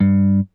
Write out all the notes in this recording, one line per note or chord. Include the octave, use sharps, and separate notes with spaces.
G2